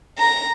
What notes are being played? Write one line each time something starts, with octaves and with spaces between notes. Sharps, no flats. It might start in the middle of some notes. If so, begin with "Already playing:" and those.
A#5